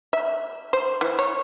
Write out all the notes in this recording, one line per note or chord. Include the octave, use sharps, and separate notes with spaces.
E5
C5
E3
C#5